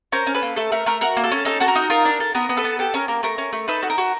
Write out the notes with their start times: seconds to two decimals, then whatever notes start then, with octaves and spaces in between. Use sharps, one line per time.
0.12 C#4 A#4 C5
0.27 C#4
0.35 A4 B4
0.42 A#3
0.56 A3 A4
0.72 A3 A#4
0.86 A3 A#4
1.01 F#4 A#4
1.17 A#3
1.24 A4
1.32 C#4
1.45 D#4 A4
1.60 F#4 A4
1.68 A#4
1.75 D#4
1.90 F4 A#4
2.05 D4
2.20 A4
2.35 B3 A#4
2.49 B3
2.57 A4 B4
2.64 B3
2.79 G4 A4
2.94 C#4 A#4
3.08 A#3 A#4
3.23 A3 A#4
3.38 C#4
3.53 A3
3.68 D#4 A4 B4
3.83 F#4
3.90 A#4
3.98 F#4